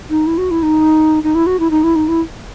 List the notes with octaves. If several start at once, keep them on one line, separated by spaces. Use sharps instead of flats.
D#4
E4
F#4
E4
D#4
D#4
E4
F#4
E4
D#4
E4
D#4
E4